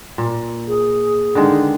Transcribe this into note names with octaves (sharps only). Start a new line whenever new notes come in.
A#2
G#4
D3 D#3 G#3